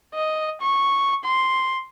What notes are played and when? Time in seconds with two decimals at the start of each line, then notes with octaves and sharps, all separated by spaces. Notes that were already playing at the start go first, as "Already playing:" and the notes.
0.15 D#5
0.61 C#6
1.24 C6